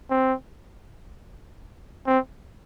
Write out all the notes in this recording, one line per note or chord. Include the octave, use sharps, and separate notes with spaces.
C4
C4